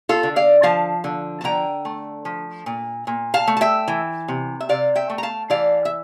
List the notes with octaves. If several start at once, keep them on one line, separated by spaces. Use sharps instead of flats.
F4 A4
D3
D5 F5
F3 F5 A5
D3
A5
D3 G5 A#5
A3
F3
A#2
A#2
F5 A5
A3
A5
E5 G5
E3
C3
E5
C3 D5 F5
E5 G5
A3
A#5
F5 A5
E3 D5 F5
E5